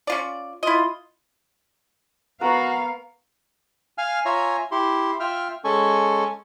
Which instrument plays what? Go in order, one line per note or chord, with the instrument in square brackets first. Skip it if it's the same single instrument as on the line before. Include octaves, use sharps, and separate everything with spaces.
[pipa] C#4 F4 D5
[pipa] E4 D#5 [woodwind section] F4
[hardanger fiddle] B3 [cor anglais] F#4 [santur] A#4 B5 C#6 [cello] F5
[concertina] F5 G#5 F6
F4 C#5 E5 G#5 A#5
E4 G4 C6
F4 E5 G5 F6
G#3 C#4 A4 G#5 C#6